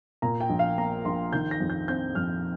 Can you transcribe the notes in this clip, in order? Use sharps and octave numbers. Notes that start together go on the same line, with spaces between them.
A#2 A#5
G5
A#1
F5
A#3 A#5
A#1 C6
D#3 G6
A#6
F2
G6
C4 G6
F2 F6